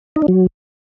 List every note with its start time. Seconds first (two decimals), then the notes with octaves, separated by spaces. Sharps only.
0.16 D#4
0.22 D4
0.28 F#3